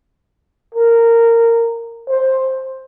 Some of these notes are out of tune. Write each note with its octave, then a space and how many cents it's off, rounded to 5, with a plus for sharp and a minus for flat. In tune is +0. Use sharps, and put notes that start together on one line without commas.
A#4 -15
C5 +10